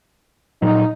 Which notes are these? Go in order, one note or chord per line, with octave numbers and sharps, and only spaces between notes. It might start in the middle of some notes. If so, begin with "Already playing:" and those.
A#2 F#3 D#4